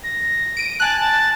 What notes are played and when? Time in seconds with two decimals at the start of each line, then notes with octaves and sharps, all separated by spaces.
0.04 A#6
0.57 D7 D#7
0.80 G#5 A5 F#6
1.00 A5